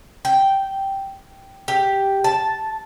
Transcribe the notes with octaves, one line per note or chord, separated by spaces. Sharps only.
G5
G4
A5